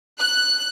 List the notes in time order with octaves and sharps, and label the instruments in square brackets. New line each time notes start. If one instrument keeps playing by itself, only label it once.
[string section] F#6